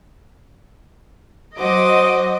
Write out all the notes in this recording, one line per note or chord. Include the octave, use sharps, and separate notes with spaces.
F#3 F#4 C5 D#5 D6 D#6